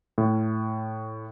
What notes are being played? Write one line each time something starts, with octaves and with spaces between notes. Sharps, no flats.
A2